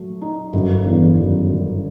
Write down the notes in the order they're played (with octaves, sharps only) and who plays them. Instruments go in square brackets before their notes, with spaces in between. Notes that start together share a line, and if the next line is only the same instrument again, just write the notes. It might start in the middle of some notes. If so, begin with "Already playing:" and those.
Already playing: [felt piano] F#3 A3
D#4
[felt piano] G1 [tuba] F#2
[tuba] E2 [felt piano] G2
[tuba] F#2 [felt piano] D#3
[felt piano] G1